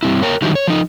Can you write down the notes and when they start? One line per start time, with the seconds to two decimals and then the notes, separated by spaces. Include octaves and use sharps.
0.03 G2 C#3 C4 E4
0.23 A#4 C#5 G5
0.42 D3 D#3 F#3 G3 D#4 E4
0.55 C#5
0.67 F3 D#4